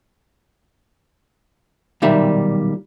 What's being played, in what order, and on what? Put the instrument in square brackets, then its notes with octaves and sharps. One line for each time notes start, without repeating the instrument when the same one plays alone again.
[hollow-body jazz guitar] B1 A#2 D#3 G3 E5